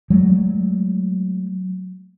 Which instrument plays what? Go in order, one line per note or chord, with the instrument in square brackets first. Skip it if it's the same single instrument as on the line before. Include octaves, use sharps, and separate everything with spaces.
[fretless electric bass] F#3 G#3 A3